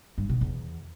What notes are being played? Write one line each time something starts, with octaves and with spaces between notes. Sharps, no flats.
G2
B2
E2